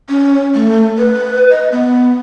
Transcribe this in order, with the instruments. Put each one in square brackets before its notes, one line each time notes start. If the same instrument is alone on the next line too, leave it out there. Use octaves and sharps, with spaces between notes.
[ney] C#4
A3
B4
D#5
B3